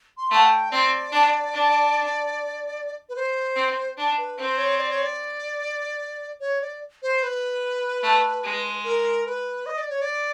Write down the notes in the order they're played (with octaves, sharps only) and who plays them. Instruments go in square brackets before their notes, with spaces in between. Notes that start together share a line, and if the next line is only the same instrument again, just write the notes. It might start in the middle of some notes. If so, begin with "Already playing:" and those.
[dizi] C6
[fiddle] A3 [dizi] F#5
[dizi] G5
[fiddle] C4 [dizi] D5
[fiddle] D4
D4
[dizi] B4
C5
[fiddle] C4
D4
[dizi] B4
[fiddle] C4 [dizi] C5
[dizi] C#5
D5
C#5
D5
C#5
D5
C5
B4
[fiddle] A3
G#3
[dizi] A#4
B4
D#5
D5
C#5
D5